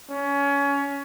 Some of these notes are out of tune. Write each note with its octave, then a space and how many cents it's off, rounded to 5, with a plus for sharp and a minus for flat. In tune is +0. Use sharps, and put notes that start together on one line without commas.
C#4 +20